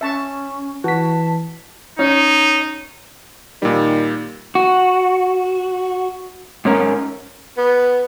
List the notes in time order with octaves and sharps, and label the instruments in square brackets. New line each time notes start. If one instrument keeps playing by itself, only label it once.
[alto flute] C#4 [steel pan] E5 A5 C#6
[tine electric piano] E3 B6 [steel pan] F#4 [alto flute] A5
[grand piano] C#4 [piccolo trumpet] D#4
[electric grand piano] A#2 G3 [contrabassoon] D#3
[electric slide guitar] F#4
G#2 C#4 A#4
[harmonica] B3